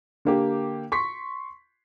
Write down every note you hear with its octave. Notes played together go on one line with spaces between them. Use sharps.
D3 A#3 G4
C6 C#6 B6